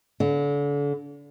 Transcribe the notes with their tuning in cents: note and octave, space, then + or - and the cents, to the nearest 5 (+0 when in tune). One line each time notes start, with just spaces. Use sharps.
D3 -35